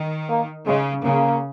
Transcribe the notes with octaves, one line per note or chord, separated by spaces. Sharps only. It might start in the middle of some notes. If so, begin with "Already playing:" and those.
Already playing: D#3
A#3
C#3 G#3
C#3 A#3